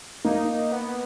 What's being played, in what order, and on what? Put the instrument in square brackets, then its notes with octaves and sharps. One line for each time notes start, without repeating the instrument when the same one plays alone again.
[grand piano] A#3 [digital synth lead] D#4
[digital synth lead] B3